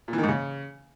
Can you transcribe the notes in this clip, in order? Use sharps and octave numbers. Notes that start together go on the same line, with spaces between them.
A#2
E3
D#3
G#2
C#3